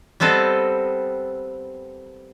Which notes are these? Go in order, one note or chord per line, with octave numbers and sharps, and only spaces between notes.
G3 B3 C4 A4 D#5